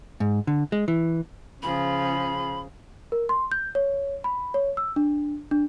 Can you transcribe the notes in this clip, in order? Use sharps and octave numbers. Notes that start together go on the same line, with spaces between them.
G#2
D3
G#3
E3
C#3 F3 G#4 B5
A#4
C6
G6
C#5
B5
C#5
E6
D4
D4